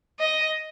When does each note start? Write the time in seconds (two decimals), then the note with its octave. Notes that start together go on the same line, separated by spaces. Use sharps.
0.19 D#5